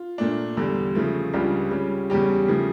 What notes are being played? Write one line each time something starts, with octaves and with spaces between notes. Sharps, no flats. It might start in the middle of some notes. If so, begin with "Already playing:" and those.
Already playing: F4
A#2 A3 D4
E2 D3 G3
C#3 F3 A3
C#2 C#3 G3 D4 F4
C#3 G3 C#4
E2 C#3 G3 C#4 G4
C#3 F3 A3